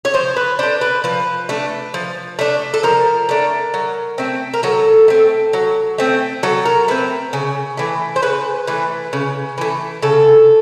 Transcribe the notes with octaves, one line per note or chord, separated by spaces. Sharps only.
C#5
F3 C5
B4
A3 D4 C5
B4
F3 B4
A3 D4
F3
A3 D4
A4
F3 A#4
A3 D4
F#3
A3 C4
A#4
F#3 A4
A3 C4
F#3
A3 C4
F#3 A4
A#4
A3 C4 B4
C#3
E3 A3
C5
C#3 B4
E3 A3
C#3
E3 A3
C#3 A4